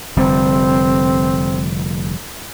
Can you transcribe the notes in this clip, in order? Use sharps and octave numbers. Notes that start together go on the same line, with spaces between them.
F1 D3 G3 C4